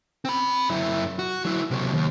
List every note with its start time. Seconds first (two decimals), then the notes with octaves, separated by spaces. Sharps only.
0.25 C4 B5
0.70 F#2 E4
1.19 F#4
1.45 F#3 E4
1.71 C3 F#3
1.93 D#2